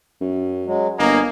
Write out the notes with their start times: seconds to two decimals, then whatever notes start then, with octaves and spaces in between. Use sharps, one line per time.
0.21 F#2
0.66 F#3 G#3
0.99 G1 A#3 D#5 G#5 A#5